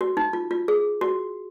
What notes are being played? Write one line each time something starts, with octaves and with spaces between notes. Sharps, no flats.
F#4
D#4
F4
F4
G#4
F#4